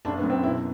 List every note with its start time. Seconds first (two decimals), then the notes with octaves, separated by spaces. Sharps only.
0.05 F#1 D4
0.17 B3
0.23 F#2
0.30 C4
0.43 B2 E4